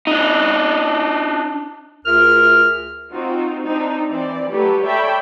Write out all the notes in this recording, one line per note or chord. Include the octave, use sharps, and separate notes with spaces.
D4 D#4
D2 F4 G#4 A#4 E5 F6
C4 D#4 F4 F#4
C4 D4 D#4
E3 C4 D5
F#3 A3 G4 A4 B4 C#5
A4 C#5 D5 E5 G5 B5